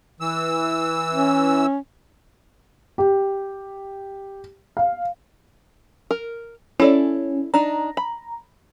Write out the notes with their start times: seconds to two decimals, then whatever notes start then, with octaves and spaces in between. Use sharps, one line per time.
0.20 E3 E6
1.13 C#4
2.98 G4
4.77 F5
6.11 A#4
6.80 C#4 E4 A4 D5
7.54 D4 D#4 A#5
7.97 B5